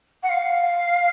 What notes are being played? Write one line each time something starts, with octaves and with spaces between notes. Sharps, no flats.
F#5
F5